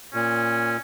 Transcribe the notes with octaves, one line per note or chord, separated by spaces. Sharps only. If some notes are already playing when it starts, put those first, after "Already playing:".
A#2 C#4